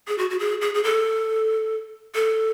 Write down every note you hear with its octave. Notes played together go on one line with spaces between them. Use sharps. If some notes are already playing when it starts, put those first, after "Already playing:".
G#4
F#4
F#4
G#4
G#4
G#4
A4
A4